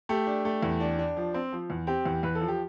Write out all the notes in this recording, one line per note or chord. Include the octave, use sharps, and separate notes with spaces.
A3 G4
D4
A3
E2
D4
D4
F3
C4
F3
E2
C4 G4
E2
E2 B4
A4
F3
G4